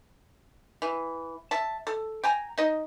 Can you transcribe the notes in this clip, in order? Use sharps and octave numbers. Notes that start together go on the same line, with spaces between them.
E3
E5 A5
A4
G5 G#5 A#5
D#4 D#5